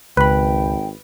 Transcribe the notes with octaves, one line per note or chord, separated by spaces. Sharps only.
G#1 C#2 B4 G5 B5